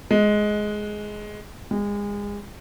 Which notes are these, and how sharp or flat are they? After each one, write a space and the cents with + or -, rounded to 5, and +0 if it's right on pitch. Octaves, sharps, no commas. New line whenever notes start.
G#3 +10
G#3 -30